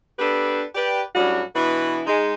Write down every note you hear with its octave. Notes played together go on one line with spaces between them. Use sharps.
B3 D4 G4 A4 B4
G4 B4 D5
A2 F#3 G3 C#4 D4 F#4
B2 E3 B3 D4 E4 B4
G#3 D#4